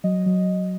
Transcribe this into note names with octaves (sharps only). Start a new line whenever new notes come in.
F#3 D#5
F#3